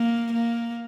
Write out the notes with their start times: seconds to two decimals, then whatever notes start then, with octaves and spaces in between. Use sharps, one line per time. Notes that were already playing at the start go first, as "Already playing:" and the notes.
Already playing: A#3
0.32 A#3